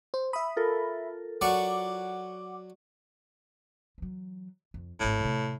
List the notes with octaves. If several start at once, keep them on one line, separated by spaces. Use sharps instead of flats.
C5
E5 B5 D#6
F4 A4 A#4
F#3 D5 F#5 C#6 D6
E3 F#3
F2
D1 G#1 A2
C3 A3